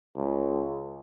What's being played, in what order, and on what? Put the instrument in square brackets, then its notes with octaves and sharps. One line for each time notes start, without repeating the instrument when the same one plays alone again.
[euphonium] C#2